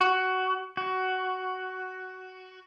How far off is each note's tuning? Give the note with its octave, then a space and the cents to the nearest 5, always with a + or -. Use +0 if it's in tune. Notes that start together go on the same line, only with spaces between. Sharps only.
F#4 +15
F#4 +10